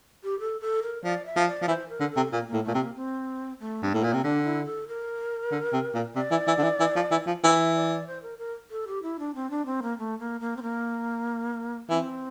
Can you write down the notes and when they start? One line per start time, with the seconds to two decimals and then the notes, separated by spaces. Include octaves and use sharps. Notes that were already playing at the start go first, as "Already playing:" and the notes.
0.24 G4
0.40 A4
0.61 A4
0.83 A#4
1.04 F3 D5
1.26 E5
1.36 F3
1.47 D5
1.62 F3
1.67 E3 C5
1.89 A#4
2.00 D3
2.11 A4
2.16 C3
2.31 A#2 A#3
2.48 A2 A#3
2.64 A#2 A3
2.74 C3
2.80 A#3
2.96 C4
3.60 A3
3.82 G2 C4
3.92 A2 A#3
4.03 A#2
4.13 C3
4.23 D3 D4
4.44 E4
4.66 A4
4.88 A#4
5.51 D3
5.73 C3
5.94 A#2
6.15 C3 D5
6.31 E3
6.47 E3
6.58 D3
6.63 E3
6.80 E3
6.96 F3
7.11 E3
7.26 F3
7.44 E3 E5
7.76 D5
8.07 C5
8.23 A#4
8.38 A#4
8.70 A4
8.87 G4
9.03 E4
9.19 D4
9.35 C4
9.51 D4
9.66 C4
9.82 A#3
9.99 A3
10.19 A#3
10.41 A#3
10.57 C4
10.62 A#3
11.90 E3 C4